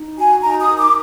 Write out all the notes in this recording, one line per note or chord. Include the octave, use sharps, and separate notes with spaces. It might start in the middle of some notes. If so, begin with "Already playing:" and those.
Already playing: D#4
F#4 G#5
D#4 A#5
D#6
A#4
D6